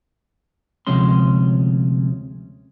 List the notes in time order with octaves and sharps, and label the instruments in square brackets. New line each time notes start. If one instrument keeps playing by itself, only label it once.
[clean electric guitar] D2 C3 F3 G#3 C#4 C6